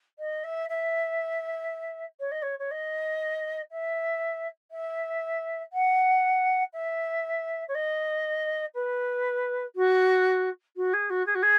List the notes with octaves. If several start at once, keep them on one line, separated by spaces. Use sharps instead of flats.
D#5
E5
E5
C#5
D#5
C#5
C#5
D#5
E5
E5
F#5
E5
C#5
D#5
B4
F#4
F#4
G#4
F#4
G#4
F#4
G#4